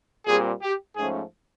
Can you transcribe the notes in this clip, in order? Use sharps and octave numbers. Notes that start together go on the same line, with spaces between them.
A#2 G3 C4 G#4
G4
G#2 F3 A3 C#4 G#4